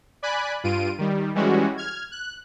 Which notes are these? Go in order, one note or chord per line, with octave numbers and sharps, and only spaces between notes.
D5 G#5 B5 F#6
G2 F4 D7 D#7
D#3 G3
E3 G3 G#3 C#4 F#4
F6 G#6
F#6